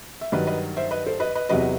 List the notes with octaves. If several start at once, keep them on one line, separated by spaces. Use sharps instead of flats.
E5
G2 D#3 F#3 B4 D#5
B4 D#5
C5 E5
B4 D#5
A4 C5
B4 D#5
B4 D#5
E2 C3 F#3 B4 D#5